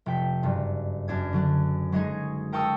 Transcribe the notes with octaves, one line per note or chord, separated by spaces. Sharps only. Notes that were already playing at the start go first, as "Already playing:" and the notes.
F1 G5 B6
F#1 G2
F#2 D4 G#6
D3 F#3 D4
F#3 G#3 C#4 D#4 G#4
A#4 G5 A5 C#6 D#6 E6